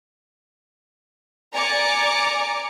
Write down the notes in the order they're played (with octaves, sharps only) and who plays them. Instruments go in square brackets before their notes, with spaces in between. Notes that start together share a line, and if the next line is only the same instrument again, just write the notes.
[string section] D5 G#5 A#5 D6 C#7